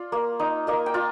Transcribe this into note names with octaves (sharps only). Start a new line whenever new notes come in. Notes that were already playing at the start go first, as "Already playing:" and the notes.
Already playing: F4 D5
A#3
D#4
A#3 D#5
G5
F4